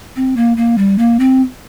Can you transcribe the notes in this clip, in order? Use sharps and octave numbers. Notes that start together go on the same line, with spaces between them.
C4
A#3
A#3
G3
A#3
C4